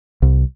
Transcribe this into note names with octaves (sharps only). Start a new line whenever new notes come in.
C2